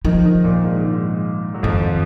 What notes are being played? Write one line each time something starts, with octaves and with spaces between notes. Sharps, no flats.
D#3 F3 D#4
D#3 D#4
A#2 A#3
G#2 G#3
G#2 G#3
F#3
F2 D#3 F3